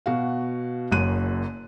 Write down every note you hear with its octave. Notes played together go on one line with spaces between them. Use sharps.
B2 F#4 F5
F#1 F#2 F#6 D#7